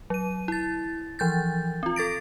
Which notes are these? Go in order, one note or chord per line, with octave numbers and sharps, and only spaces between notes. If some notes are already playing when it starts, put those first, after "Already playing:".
F#3 D#7
E4 A6
E3 F3 G6 A6
C4 F4
A4 A6 A#6 D7